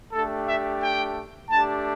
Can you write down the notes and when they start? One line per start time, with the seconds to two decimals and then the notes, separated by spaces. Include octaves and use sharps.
0.12 A3 D4 G4 A4
0.47 E5
0.81 G5
1.50 A3 D4 G4 A5